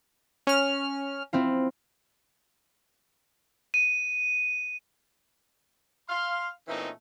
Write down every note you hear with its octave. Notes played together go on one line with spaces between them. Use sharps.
C#4 F6
C4 E4 F4
D#7
F5 C6
A#2 E3 A3 C4 C#4 D#4